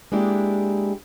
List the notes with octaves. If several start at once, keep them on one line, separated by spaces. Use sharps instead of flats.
G#3 A#3 D4 E4 G4